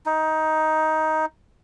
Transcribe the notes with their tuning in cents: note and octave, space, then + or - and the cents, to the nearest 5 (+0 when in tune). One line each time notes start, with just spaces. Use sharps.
D#4 +15